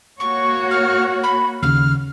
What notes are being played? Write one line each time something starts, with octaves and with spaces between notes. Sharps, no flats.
A#3 F#4 C#5 C#6
F6
B5
D#2 C#3 F6